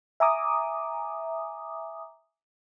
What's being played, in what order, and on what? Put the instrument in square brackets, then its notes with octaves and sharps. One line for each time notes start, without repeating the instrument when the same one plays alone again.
[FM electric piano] E5 G#5 A#5 D6 D#6